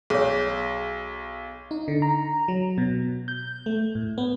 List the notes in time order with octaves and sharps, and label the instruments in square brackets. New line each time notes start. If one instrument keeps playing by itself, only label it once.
[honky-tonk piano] B1 [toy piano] G#4 C#5
[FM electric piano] D#4
D3
A#5
F#3
B2
G6
A3
A2
B3